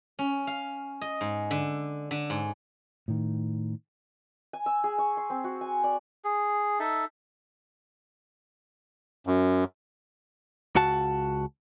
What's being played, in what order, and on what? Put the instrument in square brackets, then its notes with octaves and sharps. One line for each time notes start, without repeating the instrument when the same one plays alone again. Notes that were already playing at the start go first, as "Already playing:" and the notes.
[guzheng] C#4
F5
D#5
G#2
D3
D3
G#2
[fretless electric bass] A2 D#3
[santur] G#5
E6
G#4
C#6
C6
C4
F#4
G#5
D5
[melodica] G#4
D#4 A4 E5
[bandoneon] F#2
[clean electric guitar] C#2 F#4 A5